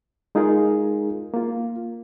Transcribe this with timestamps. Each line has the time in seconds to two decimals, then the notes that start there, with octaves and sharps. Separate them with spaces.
0.35 G#3 D#4 F4 G#4 A#4
1.34 A#3 F4